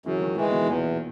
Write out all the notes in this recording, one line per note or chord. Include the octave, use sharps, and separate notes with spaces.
F#2 C#3 E3
D#3 F#3
D#3 E3 F#3 G#3
B2 D#3
E2 A#2 C#3